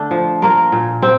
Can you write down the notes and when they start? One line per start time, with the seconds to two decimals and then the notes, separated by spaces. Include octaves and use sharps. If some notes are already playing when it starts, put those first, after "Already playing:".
Already playing: D3 A3 D4
0.11 F3
0.42 A#3 F4 A#4
0.72 A#2
1.02 C4